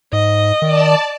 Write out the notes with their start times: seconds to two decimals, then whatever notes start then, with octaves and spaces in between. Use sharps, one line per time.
0.13 G#2 D#5
0.62 D#3 D5 A5